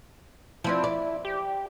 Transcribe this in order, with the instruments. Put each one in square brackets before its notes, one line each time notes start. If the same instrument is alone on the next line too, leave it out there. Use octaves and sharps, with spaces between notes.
[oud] F3 C4 D4 [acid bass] E4
[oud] D5
[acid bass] G4